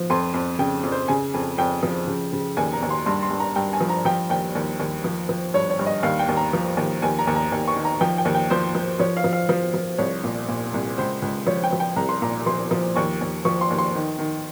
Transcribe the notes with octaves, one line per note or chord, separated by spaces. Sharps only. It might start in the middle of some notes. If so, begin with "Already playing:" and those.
Already playing: F3
F2 C6
F2
C#3 G5
F2
C5
C#3 G#5
F2
F2 G5
F3
C#3
C#3
D#2 G#5
A#5
D#2
C6
G2 C6
C6
G2
A#5
G2 G5
G#5
F3
A#5
F3 G5
D#2 G5
D#2
D#2
F3
F3
G2 C#5
C#5
G2
D#5
D#2 F5
G5
D#2
A#5
F3
D#2
D#2 G#5
A#5
D#2
A#5
D#2
C#6
D#3
A#5
F3 G5
G5
D#2
G5
F3 C5
F3
F3 C#5
F5
F3
F5
F3
F3
C2 C#5
A#2
A#2
C2
C#2 C5
C#2
F3 C#5
G5
F3
G5
C2 A#5
C6
A#2 A#5
F3 C6
F3
D#2 C#6
D#2
F3 C#6
C6
D#2
C6
D#3
D#3